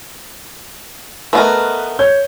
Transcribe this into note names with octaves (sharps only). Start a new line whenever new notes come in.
A3 B3 A#4 B4 D#5
C#5 G6 G#6